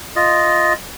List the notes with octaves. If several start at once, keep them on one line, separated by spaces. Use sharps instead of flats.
F4 D#5